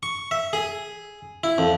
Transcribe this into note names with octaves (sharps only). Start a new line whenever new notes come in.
C#6
E5
G#4
E4
F2